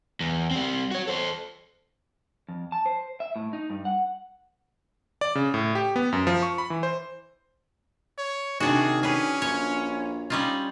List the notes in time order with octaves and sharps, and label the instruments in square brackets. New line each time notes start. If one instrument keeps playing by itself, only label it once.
[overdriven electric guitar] E2
G3 C4
F#4 C#5
A4 C5
[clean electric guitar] F2
A5
C5
E5
A2
D#4
G2
F#5
[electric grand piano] D5
C#3
A2
G4
B3
F#2
F3
C#6
B5
E3
C5
[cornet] C#5
[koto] C3 D4 F#4 [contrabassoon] D#3 [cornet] G#4
[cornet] C#4 [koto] G#4 B4
[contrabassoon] A#1 [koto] C#5
[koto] G3 C#4 F4 [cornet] D#4